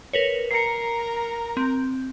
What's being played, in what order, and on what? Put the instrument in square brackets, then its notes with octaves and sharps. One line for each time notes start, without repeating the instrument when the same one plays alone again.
[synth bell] A#4 B4 C#5
[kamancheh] A#4 A#5 [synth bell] C7 C#7
[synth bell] C4